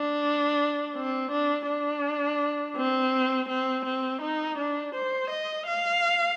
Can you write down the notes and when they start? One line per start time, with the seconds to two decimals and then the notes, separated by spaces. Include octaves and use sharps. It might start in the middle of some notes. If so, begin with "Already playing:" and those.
Already playing: D4
0.96 C4
1.31 D4
1.68 D4
2.77 C4
3.49 C4
3.85 C4
4.22 D#4
4.58 D4
4.95 C5
5.30 D#5
5.67 F5